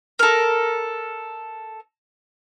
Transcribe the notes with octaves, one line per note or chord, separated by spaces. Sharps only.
A4 A#4